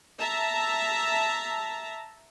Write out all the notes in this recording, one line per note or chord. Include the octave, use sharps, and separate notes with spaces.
E5 A5 A#5